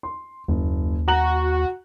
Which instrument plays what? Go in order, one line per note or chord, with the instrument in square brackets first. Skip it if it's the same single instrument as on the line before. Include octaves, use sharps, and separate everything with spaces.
[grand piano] C6
[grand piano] F#1 [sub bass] D#2
[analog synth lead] F#4 [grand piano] A#5 F#6 F#7